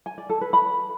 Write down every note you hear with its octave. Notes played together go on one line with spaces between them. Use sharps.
G#5
D5
A4
B4
B5